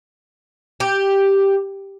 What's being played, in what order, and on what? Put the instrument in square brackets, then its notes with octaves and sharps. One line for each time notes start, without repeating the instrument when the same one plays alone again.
[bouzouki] G4